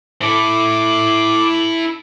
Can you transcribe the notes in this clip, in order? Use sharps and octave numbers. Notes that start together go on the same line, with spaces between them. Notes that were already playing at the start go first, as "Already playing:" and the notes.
E4 A4 D6